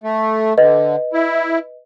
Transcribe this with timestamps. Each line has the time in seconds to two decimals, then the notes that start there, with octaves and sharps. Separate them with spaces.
0.04 A3
0.58 D3 B4 D#5
1.13 E4